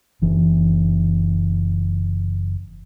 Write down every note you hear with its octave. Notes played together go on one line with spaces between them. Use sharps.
F#1 E3